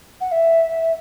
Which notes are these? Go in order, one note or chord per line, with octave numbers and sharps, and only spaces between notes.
F#5
E5